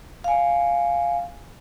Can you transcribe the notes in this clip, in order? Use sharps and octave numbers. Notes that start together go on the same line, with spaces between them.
F5 G#5